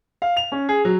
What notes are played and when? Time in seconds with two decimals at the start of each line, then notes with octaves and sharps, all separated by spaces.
0.22 F5
0.37 F7
0.52 C#4
0.69 G#4
0.85 F#3